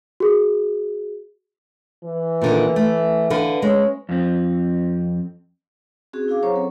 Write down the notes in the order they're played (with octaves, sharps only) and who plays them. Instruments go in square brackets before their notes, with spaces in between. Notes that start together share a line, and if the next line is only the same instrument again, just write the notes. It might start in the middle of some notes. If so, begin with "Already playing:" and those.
[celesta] F#4 G#4
[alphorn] E3
[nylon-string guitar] A#2 D3 D#3
A3
D3 B4 F5
[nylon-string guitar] G#3 [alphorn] C#4
[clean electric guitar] F2 C4
[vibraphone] C4 C#4 F#4 G#4
E4 G#4 F5 D6
F#3 C#4 C5 C#5 A#5 C#6
C4 A4